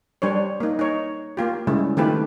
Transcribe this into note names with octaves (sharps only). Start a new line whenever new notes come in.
G3 D4 C5 C#5
A#3 D#4
D#4 C#5
A#3 F4 G4
C#3 G3 G#3 E4
D#3 A3 C4 F4 G4 B4